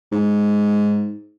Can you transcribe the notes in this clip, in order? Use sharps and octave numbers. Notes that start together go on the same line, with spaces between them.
G#2